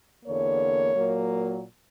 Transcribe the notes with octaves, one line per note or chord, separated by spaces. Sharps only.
E2 D3 A#3 C#5
A#2 F#3 A#3